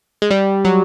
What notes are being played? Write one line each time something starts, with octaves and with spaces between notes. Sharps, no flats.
G#3
G3
F#3